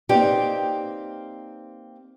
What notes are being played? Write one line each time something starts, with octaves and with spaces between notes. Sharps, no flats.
A#3 C4 D#4 G4 B4 D5